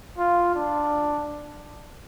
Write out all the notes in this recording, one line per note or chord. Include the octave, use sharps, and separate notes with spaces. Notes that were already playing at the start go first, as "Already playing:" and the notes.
F4
D4